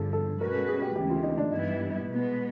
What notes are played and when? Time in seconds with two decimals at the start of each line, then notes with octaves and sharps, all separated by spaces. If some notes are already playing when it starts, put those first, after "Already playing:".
Already playing: G2 D3 F3 G#4 A4
0.13 A4
0.41 B2 G#3 C#4 F#4 A#4 B4
0.54 A4
0.68 G#4
0.82 G4
0.96 D2 C#3 E3 G#3 G4
1.10 F4
1.23 D#4
1.38 D4
1.52 G2 E3 G3 B3 D#4 E4
2.07 B2 G#3 B3